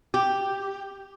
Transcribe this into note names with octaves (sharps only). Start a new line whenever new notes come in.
G4